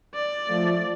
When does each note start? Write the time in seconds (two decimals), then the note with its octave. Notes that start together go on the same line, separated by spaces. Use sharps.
0.14 D5
0.47 F3 A3